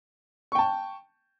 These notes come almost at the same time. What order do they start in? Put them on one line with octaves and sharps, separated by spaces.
C#6 G5 A5